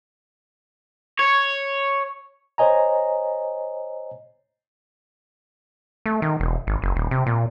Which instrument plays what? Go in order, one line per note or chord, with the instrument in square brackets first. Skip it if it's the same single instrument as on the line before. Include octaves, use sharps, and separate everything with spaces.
[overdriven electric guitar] C#5
[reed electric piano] C5 C#5 D#5 G#5 A#5
[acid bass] A3
D#3
E1
G#1
F#1
D#1
C3
A#2